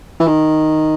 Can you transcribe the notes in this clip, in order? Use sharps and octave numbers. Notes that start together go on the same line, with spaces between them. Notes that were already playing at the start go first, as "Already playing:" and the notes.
E3
D#3